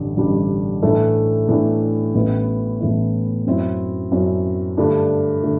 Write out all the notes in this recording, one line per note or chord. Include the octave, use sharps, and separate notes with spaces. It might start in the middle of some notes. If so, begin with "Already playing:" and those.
Already playing: A1 G2 D3 G3 D4
A1 G2 D3 G3 D4
A2 E3 A3 D4
A2 E3 A3 D4
A1 A2 E3 B3 E4
A1 A2 E3 B3 E4
F#2 F#3 C4 E4
F#2 F#3 C4 E4
G2 D3 A3 D4
D3 A3